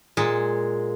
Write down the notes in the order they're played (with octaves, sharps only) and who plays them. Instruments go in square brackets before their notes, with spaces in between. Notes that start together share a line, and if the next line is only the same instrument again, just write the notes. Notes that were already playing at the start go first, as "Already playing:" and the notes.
[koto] A#2 G#3